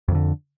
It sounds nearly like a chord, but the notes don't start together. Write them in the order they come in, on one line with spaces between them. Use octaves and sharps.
F2 D#3 D3